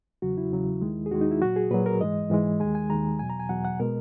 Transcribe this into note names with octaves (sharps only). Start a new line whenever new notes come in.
E2 C#3 F#3 F#4
E4
E2 C#3 F#3
D#2 D#3 G#3
G#4
D#2 D#3 G#3 F#4
D#4
E4
A#2 F#3 F#4
G#4
A#2 F#3 B4
A#4
G#2 E3 G#3 D#5
G#2 E3 G#3
D#2 D#3 G#3 G#5
G#5
D#2 D#3 G#3 A#5
E2 B2 F#3 G#5
A#5
G#5
E2 B2 F#3 F#5
F#5
B2 G#3 A#4